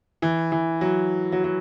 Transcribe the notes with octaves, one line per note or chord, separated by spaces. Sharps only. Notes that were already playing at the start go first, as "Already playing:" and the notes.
E3
E3
F#3
F#3
F#3